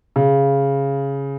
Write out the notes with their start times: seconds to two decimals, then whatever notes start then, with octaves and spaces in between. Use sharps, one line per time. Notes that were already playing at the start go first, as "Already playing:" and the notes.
0.16 C#3